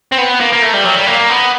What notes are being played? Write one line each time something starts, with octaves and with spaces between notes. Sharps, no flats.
C4
B3
A#3
A#3
A3
G3
F#3
G3
A#3
B3